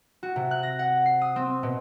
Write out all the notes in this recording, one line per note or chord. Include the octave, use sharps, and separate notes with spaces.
F#4
C3
F#6
A#6
F#5
C7
D#6
C4
B2